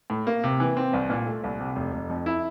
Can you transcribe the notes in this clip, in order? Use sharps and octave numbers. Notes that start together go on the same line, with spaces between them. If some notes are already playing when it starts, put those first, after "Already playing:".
A2
A#3
C3
E3
C4
C2
A#2
A3
C2
C3
F1
F1
F2
E4